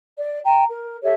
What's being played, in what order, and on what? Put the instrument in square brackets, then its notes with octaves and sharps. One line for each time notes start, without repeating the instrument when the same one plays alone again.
[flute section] D5
G5 A#5
A#4
G4 A4 C#5 E5